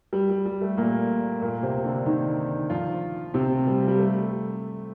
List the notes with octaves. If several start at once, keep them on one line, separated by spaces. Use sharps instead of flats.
G3
G3
G3
A3
A#2 A#3
A#2 A#3
C3 C4
D3 D4
D#3 D#4
F3 F4
C3 C4
G3
G3
A3